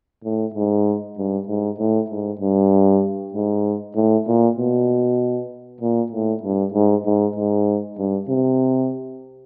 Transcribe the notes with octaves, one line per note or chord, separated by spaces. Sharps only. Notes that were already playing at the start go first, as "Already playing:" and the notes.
A2
G#2
G2
G#2
A2
G#2
G2
G#2
A2
A#2
B2
A#2
A2
G2
G#2
G#2
G#2
G2
C3